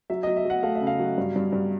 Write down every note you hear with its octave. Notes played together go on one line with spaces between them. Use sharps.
F#3 E5
F#3 D#5
E5
F#3 F#5
A3 F5
E5
C#3
F5
F#3
G2
G2
G2